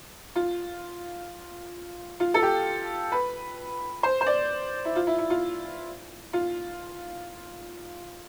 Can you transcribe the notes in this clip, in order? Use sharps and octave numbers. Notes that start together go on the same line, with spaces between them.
F4
F4
A4
G4
B4
C5
C5
D5
E4
F4
E4
E4
F4
F4